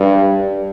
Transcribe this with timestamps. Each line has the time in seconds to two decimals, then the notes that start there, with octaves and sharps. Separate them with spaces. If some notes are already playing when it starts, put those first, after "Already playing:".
Already playing: G2